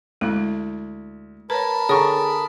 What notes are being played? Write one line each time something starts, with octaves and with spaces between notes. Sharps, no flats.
D2 G#3 E4 F#6
A#4 B4 C#5 A5 B5
D3 G#4 C#5 A#5 C#6